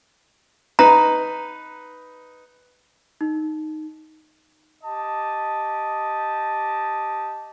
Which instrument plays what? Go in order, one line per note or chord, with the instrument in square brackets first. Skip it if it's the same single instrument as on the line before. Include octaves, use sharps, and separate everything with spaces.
[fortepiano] D#4 B4 [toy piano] A#5
[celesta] D#4
[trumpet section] G4 D#5 A5